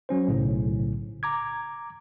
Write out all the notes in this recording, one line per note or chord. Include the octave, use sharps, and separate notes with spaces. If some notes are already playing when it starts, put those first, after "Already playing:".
F#3 C#4 C5
B1 A2 C#3
A#5 D6 G#6